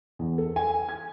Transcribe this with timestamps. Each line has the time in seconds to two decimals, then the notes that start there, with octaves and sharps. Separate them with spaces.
0.19 E2
0.38 A4
0.56 G#5
0.89 G#6